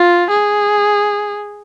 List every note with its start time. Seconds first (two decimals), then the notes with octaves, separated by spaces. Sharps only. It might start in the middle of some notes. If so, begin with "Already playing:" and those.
Already playing: F4
0.31 G#4